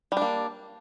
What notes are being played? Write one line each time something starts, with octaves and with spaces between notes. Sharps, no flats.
G3 A#3 D4